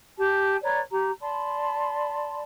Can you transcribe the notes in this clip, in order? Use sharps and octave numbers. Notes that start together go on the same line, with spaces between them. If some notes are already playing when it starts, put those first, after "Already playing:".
G4 A5
B4 C#5 D5 A#5
G4 A#5
D5 A5 B5 C6